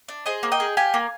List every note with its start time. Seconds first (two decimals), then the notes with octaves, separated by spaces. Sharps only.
0.08 D4
0.26 G#4 C5 D#5
0.43 A#3
0.52 D#5 G5
0.60 G#4
0.77 G4 F5 G#5
0.94 A#3